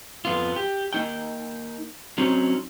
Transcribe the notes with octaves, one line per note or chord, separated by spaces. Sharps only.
F2 B3 F4
G4
A#3 D#4 G5
F#3 C4 C#4 D#4